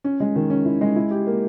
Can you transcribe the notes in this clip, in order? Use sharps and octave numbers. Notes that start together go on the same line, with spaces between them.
C#4
G#3
D#3
C#4
E4
G#3
E4
G4
A#3